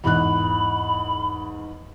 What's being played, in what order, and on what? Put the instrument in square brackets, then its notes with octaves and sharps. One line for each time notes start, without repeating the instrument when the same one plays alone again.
[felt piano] E2 G#2 F#6 [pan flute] B5